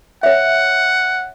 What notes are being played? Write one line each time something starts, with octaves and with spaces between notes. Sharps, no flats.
C#5 E5 F#5